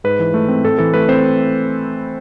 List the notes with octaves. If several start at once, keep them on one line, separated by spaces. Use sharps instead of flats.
G#2 B4
E3
A3
C4
A2 A4
E3 A4
A3 B4
C4 C5